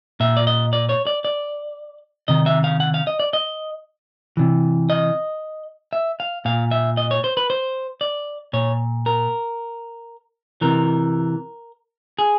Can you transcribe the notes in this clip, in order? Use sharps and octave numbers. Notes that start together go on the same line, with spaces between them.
A#2 E5
D5
D#5
D5
C#5
D5
D5
C3 D#3 D#5
E5
F5
F#5
F5
D#5
D5
D#5
C3 E3
D#5
E5
F5
A#2 F5
E5
D#5
C#5
C5
B4
C5
D5
A#2 C#5
A#4
C3 E3 A#4
G#4